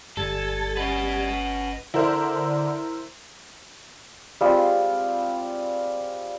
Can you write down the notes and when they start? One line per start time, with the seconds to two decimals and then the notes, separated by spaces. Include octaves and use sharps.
0.17 G1 G3 A4 G#5 A6
0.77 C#4 B4 D#5 F#5
1.94 D3 E4 A#4 C5
4.41 G3 G#3 C4 F4